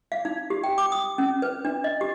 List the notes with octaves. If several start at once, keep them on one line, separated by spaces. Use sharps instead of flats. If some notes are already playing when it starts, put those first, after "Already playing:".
F5
D#4
G4
G5
D6
D#6
C#4
B4
D4
D#5
G4